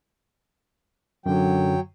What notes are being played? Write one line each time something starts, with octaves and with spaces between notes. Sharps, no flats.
F#2 D3 F#3 G5